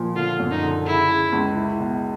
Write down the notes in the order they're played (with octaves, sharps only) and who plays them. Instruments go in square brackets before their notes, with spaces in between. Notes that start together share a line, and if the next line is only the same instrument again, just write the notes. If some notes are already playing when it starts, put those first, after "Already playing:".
Already playing: [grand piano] A#2 F3
[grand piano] D3 [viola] F4
[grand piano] F#2
[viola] D#4
[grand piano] D3
[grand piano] C#3 [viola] E4
[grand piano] C#3
C#2
E4
B2